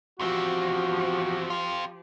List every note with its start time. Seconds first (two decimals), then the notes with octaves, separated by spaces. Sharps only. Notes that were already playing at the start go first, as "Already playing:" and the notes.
0.20 E2 F3 C4 F#4 G4
1.50 C4 F4